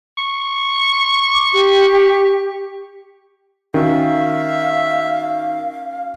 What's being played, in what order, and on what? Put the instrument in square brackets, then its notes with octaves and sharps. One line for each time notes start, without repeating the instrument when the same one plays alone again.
[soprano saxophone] C#6
[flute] D6
G4
[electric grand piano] D#3 [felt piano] C#4 F#4 [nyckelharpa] E5 [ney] F5